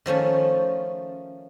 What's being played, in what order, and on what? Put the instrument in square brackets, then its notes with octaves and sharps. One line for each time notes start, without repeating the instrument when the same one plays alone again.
[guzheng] D#3 F3 A3 C#4